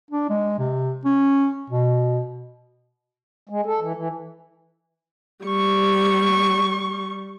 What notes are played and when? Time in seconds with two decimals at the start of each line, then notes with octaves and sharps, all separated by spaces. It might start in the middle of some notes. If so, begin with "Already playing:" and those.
0.11 D4
0.29 G#3
0.59 C3
1.05 C#4
1.70 B2
3.49 G#3
3.66 A4
3.80 E3
3.95 E3
5.44 G3 C#6